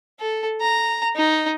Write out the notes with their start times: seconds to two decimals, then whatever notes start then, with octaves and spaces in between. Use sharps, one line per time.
0.20 A4
0.61 A#5
1.16 D#4